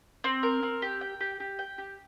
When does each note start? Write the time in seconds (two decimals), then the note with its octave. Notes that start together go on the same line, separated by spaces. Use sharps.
0.24 C4
0.43 A#4
0.63 C4
0.82 G4
1.01 G5
1.21 G4
1.40 G4
1.59 G5
1.78 G4